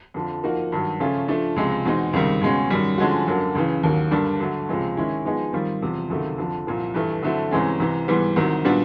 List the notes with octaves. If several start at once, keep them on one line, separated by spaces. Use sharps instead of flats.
F2 D3 F3
F3 A#3 D#4 F#4
G2 D#3 F#3
C#3 F3 A3 C#4 F4
F3 A3 D4
C#2 C3 F3 G#3
E2 B2 G#3 C4 D#4
C#2 C3 D#3 G3
C#2 B2 G#3 C#4
F#2 D#3 G3
D3 F3 G#3 C#4 F#4
F#2 D3 F#3 A#3
C#2 C#3 E3
D#2 D#3 F#3 A#3
G2 D3 G3 A#3 D4
D3 F#3 A3
C#2 C3 F3 G#3
D#3 G#3 C#4 E4
F3 G#3 B3 D#4 G#4
D#3 G3 C4 F4
E2 C3 F3
C#2 C3 D#3 F#3 A3
F2 D3 F3
C2 A#2 F3
G2 E3 A3
D3 F#3 A3 C4 E4
C2 C3 E3 G#3 C#4
C2 C3 E3
G#2 E3 G3 B3
C2 C3 D#3 F#3
A#2 G3 B3 D4 F#4